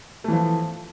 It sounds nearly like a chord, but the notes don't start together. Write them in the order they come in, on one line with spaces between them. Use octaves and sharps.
A3 E3 F3